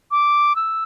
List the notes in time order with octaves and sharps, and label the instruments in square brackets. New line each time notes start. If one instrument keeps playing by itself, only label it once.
[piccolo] D6
E6